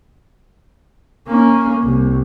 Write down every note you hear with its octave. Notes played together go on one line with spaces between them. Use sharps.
A#3 C#4
C2